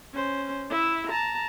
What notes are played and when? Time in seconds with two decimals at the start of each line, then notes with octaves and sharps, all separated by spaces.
0.13 C#4 C5
0.70 E4 E5
1.10 A5 A#5